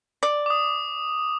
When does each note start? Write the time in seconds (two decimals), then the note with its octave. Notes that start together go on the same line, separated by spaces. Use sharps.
0.23 D5
0.46 D6 D#6